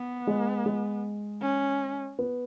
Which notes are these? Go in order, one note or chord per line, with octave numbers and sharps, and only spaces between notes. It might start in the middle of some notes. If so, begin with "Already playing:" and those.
Already playing: B3
G#3
G#3
C#4
B3